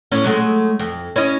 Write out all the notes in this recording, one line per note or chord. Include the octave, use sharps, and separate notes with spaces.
A2 C#4
F#3 G#3 A3
F2
C#4 E4 D#5